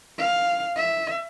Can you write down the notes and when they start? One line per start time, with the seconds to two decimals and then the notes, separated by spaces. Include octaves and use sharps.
0.18 F5
0.76 E5